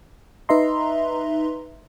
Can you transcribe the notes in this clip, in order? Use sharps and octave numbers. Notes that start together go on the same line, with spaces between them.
D#4 B4 D#5 E5 A#5 C6